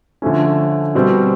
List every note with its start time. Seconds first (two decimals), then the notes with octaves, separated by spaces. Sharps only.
0.22 D3 F3 A3 C#4
0.95 B2 G3 C4